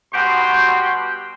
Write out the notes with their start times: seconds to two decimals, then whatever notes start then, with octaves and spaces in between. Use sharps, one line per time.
0.14 B2 G3 F#4 G4 G5 C6